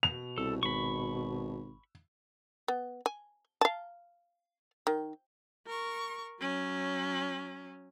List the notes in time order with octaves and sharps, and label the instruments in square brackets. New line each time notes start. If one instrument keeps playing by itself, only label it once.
[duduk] B2 [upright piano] F7
[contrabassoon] C2 [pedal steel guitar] A4
[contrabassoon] G#1 [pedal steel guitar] B5 C#6
[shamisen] B3
G#5
F5 A5
D#3
[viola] A#4 C#6
F#3 C#4